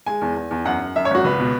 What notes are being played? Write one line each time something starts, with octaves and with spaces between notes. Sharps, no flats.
G#3 G#5
E2
E2
E2
F#2 F#5
F#2
F#2 E5
C#5
G#1 F#4
C#2 B4
B2